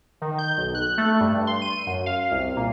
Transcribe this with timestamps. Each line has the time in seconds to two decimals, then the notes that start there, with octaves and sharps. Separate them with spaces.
0.22 D#3
0.38 G6
0.57 B1
0.74 F#6
0.98 A3
1.20 G2
1.47 C6
1.62 D#7
1.86 F#2
2.06 F5
2.31 C2
2.56 A#2